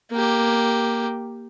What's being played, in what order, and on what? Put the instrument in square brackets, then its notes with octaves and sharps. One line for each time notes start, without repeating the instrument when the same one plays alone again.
[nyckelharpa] A#3 G4